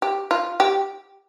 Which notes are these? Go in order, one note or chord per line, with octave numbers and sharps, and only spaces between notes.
G4
F4
G4